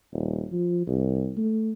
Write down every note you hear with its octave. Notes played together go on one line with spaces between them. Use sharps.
D#1
F3
C2
A3